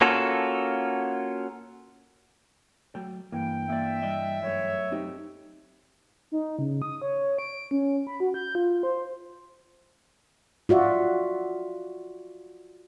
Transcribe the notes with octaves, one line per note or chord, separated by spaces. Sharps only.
A#3 C#4 F4 F#4 A4
F#3 A3 G5
G2 E3 A#3 G5
A#3 D5 E5
G3 D5 D#5
F#2 A3 C#5
C4 D#4 G4
D#4
C#3
D#6
C#5
D7
C#4
B5
F#4
G6
F4
C5
F4 F#4 D5 E5